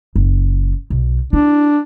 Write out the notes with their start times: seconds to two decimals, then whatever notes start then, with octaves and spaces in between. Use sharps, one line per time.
0.16 F#1
0.90 B1
1.33 D4 E4